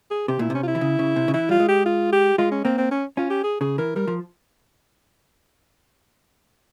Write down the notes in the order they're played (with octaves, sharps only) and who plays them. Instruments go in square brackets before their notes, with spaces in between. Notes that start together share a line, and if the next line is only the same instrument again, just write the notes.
[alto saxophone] G#4
[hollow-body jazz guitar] C3 [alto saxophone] G4
[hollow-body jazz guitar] A#2 [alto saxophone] E4
[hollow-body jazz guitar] C3
[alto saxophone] C#4
F4
E4
[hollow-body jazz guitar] E3
C#3
C#3
C3
C#3
[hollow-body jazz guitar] E3 [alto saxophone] E4
[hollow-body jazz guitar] G3 [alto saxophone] F4
[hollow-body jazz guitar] G#3
[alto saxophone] G4
F4
G4
[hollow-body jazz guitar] G#3 [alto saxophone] F4
[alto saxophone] C#4
[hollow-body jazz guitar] A#3 [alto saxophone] C4
[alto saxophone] C4
C#4
[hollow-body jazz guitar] C#4 [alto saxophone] F4
[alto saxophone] G4
G#4
[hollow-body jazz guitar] C#3 [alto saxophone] G#4
[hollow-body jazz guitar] E3 [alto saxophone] A#4
[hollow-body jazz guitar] G3 [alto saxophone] A#4
[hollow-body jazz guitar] F3